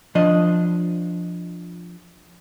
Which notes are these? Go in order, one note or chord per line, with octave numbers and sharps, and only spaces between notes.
F3 D4 D#5